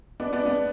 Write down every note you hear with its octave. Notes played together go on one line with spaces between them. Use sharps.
B3 D4
B3 D4
B3 D4